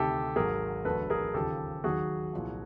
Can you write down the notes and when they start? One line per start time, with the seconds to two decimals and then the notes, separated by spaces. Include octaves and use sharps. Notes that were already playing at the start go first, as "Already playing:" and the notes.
Already playing: D2 C3 D#3 G4 A4
0.36 G#1 G#2 D#3 F#3 G#4 A#4
0.85 E1 D2 D3 F#3 A4 B4
1.10 G#4 A#4
1.34 D#2 C#3 F3 G4 A4
1.84 D#2 D#3 F#3 F#4 G#4
2.33 C2 A#2 F3